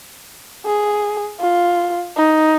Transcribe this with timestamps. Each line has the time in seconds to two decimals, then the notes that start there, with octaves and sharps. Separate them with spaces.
0.65 G#4
1.40 F4
2.16 D#4